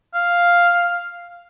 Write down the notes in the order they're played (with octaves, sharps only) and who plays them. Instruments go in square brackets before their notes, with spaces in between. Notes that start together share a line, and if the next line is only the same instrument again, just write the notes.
[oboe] F5